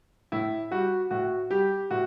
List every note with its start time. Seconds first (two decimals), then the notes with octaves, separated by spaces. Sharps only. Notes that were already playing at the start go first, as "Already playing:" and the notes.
0.32 A2 E4
0.71 G3 F#4
1.11 A2 F#4
1.50 G3 G4
1.91 A2 F#4